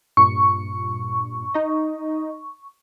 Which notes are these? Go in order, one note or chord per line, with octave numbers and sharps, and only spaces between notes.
G2 A#2 C#6
D#4 D#5